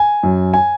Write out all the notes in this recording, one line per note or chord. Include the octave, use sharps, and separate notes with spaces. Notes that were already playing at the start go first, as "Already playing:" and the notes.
Already playing: G#5
F#2
G#5